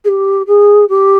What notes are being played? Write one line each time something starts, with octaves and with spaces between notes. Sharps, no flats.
G#4
G4
G#4
G4